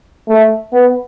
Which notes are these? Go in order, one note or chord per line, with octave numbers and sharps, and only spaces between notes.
A3
B3